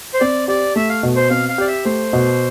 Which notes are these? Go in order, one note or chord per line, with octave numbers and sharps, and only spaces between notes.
C5
C4 D5
G4 D5
A3 E5
F5
B2
C5
C4 F5
F5
G4 D5
E5
A3 C5
B2